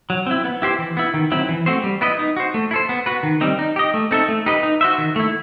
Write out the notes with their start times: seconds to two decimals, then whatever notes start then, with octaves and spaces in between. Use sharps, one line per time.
0.10 F#3
0.26 C4 E4
0.44 B3
0.62 E4 G4 C5
0.79 E3
0.97 B3 E4
1.14 D#3
1.31 F#3 C4 E4
1.49 E3
1.66 A3 C4 F#4 C5
1.84 G3
2.01 B3 E4 B4 D#5
2.19 D#4
2.37 F#4 C5
2.54 A3
2.71 E4
2.73 A4 C5
2.89 B3
3.06 F#4 B4
3.23 D#3
3.41 G3 C4 D#4
3.59 D#4
3.76 G4 D#5
3.94 A3
4.11 C4 D#4 A4 E5
4.28 A3
4.46 D#4 G4 B4 D#5
4.63 D#4
4.81 F#4 C5 E5
4.98 D#3
5.16 A3 E4